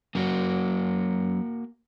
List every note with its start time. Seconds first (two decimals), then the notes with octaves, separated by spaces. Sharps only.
0.15 F#2 F#3 A#3 F#4